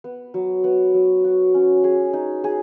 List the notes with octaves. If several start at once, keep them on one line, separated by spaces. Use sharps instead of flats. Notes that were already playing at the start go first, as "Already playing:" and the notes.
B3
F#3
B3
F#3
F#4
C#4
G#4
D#4
G#4